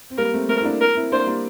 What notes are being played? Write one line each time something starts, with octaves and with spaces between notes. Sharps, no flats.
C4
G3 A#3 A#4
A3 C4
A3 C4 A#4
E4
A#3 D4
A#4
C4 E4
A#3 D4 C5
G3 A#3